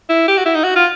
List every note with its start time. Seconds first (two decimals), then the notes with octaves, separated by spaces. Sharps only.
0.10 E4
0.28 G4
0.37 F#4
0.46 E4
0.55 D#4
0.64 F#4
0.76 F4